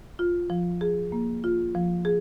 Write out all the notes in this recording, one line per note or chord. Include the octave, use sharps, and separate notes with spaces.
F4
F3
G#4
A#3
F4
F3
G#4